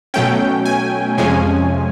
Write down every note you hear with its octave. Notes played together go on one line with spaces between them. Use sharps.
B2 F#3 A3 C#4 G5
G#5
F2 C3 F3 G#3 C#4 G#5